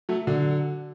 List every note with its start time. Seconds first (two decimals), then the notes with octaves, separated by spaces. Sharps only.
0.09 F#3 A3
0.27 D3 F#3